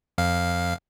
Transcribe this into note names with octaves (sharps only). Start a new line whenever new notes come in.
F2 F5